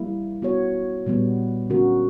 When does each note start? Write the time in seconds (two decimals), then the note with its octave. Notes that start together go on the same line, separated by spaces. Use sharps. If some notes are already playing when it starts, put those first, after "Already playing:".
Already playing: G3 A#3 E4
0.42 B3 F#4 C#5
1.06 A#2 G3 B3
1.70 D3 A#3 C#4 F#4 A#4